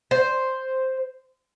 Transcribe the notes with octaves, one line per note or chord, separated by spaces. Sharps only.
C5